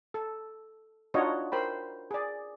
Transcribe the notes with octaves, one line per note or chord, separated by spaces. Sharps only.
A4
D4 D#4 F4 F#4 C#5 D#5
A#4 C5 G5 B5
G#4 D5